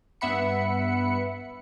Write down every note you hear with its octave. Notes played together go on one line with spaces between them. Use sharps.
G2 B3 E5 F#5 B5 C#7